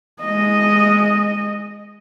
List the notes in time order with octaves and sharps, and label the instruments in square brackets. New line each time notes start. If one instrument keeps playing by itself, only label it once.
[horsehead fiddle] G#3 D#5